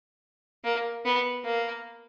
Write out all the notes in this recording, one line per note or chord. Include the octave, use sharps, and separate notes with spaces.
A#3
B3
A#3